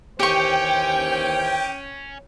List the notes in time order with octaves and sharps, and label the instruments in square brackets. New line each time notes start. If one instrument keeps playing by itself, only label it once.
[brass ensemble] D#2 E3 C5 [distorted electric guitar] C#4 [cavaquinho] G4 C#6 [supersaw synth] G5